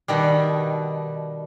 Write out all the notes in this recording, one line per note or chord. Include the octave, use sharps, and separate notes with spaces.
B2 D#3 G3